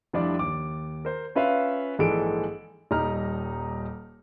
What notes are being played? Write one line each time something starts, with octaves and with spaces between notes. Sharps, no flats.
F1 F3 G3 D4 E4 D5
D#2 D6
A#4 C5
C#4 F4 B4 E5 F5
A#1 G#2 E3 G#3 A4 D7
D#1 G3 D#4 A#5 F6